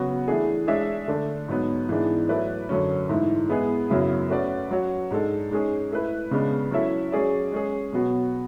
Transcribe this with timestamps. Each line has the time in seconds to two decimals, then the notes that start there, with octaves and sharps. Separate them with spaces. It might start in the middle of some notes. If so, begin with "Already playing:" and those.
Already playing: C#3 F#3 B3 F#4
0.28 E3 A3 D4 G#4
0.67 G#3 D4 G#4 C#5 E5
1.08 D3 A3 D4
1.48 G#2 F#3 B3
1.89 G#2 E3 B3 D4 G#4
2.29 F#3 A3 E4 B4 D5
2.69 F#2 D3 F#3 C#4
3.09 G#2 E3 A3 E4
3.49 G#3 B3 E4 G#4 B4
3.90 F#2 C#3 F#3 B3 E4
4.29 A3 C#4 F#4 B4 D5
4.71 F#3 C#4 F#4 C#5
5.11 G#2 G#3 D4 A4
5.51 G#2 G#3 C#4 G#4
5.92 A3 E4 B4
6.31 C#3 G#3 B3 D4
6.71 F#3 C#4 E4 A4 E5
7.12 F#3 C#4 G#4 D5
7.52 G#3 C#4 G#4
7.92 B2 F#3 B3 F#4